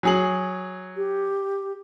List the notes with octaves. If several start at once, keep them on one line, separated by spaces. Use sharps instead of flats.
F#3 G#4 F#7
G4